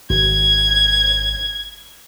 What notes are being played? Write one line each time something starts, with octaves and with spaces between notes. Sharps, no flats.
G#1 G#6